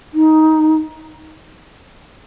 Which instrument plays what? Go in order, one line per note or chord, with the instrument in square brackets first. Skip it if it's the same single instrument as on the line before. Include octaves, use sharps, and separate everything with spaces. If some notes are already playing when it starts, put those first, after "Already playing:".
[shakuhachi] D#4